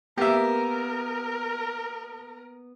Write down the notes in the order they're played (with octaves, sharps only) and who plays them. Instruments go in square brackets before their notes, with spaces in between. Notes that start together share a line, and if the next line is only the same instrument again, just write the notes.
[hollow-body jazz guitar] A#3 B3 [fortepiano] G4 E5 [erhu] A#4